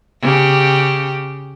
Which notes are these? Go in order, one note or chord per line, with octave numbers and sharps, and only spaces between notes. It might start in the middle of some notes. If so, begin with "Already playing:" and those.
C#3 G4